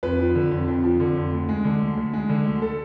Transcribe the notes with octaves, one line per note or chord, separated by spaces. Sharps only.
F2 B4
F3
D3
F2
F2
F3
D3
F2
D2
G#3
D3
D2
D2
G#3
D3
D2
A4